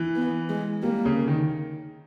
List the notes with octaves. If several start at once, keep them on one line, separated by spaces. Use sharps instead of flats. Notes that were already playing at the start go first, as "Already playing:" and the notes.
Already playing: E3
B3
G#3
G3 A#3
C#3
D#3